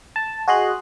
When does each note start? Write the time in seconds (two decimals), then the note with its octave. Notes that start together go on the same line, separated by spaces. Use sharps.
0.16 A5
0.48 F#4 G#4 D#5 C6 F#6